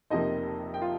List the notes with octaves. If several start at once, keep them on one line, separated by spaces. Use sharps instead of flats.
F1 F2 C3 F3 A#3 D#4 D#5
G5
F4 F5